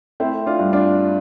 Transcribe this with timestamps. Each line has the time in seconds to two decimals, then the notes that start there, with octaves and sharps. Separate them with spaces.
0.20 A3 C4 E4
0.46 D4 F4
0.59 G2
0.73 D4 F4